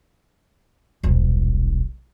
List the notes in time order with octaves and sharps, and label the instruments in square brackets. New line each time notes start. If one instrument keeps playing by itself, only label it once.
[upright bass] D#1 B1